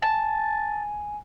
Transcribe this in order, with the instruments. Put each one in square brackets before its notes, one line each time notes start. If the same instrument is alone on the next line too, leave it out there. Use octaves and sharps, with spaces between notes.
[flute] G#5 [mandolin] A5